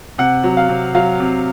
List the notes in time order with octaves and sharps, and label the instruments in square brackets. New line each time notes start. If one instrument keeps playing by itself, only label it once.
[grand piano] C3 F#5
F#3
F5
C3
F#3 F5
C3